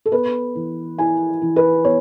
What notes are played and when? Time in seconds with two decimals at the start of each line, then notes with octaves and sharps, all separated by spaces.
0.06 A4
0.12 B3 B4
0.55 E3
0.98 E4 G#5
1.42 E3
1.56 B4
1.84 B3 C#5